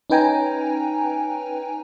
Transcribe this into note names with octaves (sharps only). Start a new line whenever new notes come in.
C#4 D#4 B4 G5 G#5 A#5